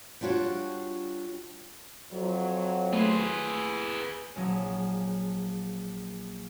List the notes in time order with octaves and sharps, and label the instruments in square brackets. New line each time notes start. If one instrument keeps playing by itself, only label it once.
[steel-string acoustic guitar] G3 D4 F4 F#4 C#5
[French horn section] F2 F#3
[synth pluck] A3 C6 [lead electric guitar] G#4 B4
[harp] A#1 F#3 G#3 C#4